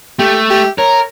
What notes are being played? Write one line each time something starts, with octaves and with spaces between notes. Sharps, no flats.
A3 G4
G4
A#4 C#5